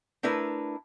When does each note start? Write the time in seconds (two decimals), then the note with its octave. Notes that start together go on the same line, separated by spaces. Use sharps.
0.23 A3 D4 E4 A#4 B4